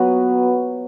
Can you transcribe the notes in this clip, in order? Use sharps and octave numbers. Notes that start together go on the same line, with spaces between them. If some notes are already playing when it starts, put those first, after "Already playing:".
Already playing: F#3 B3 F#4 B4